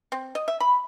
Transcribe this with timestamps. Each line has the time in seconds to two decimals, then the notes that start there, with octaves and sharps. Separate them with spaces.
0.12 C4
0.35 D#5
0.48 E5
0.60 B5